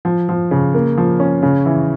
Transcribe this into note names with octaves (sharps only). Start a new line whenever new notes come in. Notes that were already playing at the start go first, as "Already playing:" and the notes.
F3
F3
C#3
A#3
F3
C#4
C#3
E3